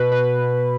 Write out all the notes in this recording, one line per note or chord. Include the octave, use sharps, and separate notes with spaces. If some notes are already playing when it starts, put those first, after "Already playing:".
Already playing: B2 B4
B2 B4